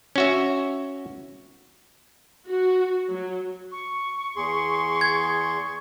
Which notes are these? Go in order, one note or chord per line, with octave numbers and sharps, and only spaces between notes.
C#4 F#4 E5
F#4
F#3
C#6
E2 G#4 C6
G#6